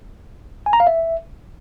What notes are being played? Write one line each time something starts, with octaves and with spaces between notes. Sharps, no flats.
G#5
A#5
F5
E5